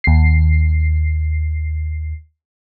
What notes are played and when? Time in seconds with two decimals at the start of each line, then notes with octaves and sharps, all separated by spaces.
0.04 D#2 C7